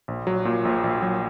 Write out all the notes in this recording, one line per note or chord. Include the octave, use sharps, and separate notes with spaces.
A#1
F#3
A#2
A#1
A#1
F#3